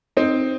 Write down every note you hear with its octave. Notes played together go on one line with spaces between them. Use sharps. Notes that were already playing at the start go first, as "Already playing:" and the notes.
C4 D#4